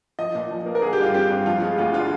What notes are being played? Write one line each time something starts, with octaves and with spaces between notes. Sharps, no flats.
F3 D#5
A#2
F3
A#3
A#4
D3 G#4
G4
G2 F4
C4 G4
G2
F3 F4
G#3
D2 F4
D3 F4